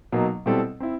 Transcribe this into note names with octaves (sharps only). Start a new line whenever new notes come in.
B2 F#3 A#3 D#4
B2 G3 C4 E4 A4
C4 E4